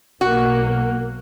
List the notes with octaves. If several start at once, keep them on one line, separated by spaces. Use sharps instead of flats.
B1 A#3 F#4